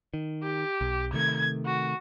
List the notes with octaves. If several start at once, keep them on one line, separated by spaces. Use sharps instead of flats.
D#3
G4
B1
C3 D#3 A3 G#6
F#4